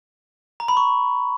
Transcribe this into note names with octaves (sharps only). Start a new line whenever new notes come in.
A#5
B5
C#6